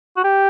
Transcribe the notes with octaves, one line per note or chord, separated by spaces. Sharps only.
F#4
G4